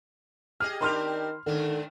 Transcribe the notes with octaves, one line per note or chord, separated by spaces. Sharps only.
G4 G#4 D#5 F6
D#3 C4 D4 G4 B5 C6 F6
G#2 D3 D#3 C4 D4